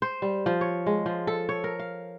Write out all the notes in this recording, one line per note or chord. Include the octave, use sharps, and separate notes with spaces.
C5
G3
F3
C#5
G#3
F3
A4
C#5
A#4
F5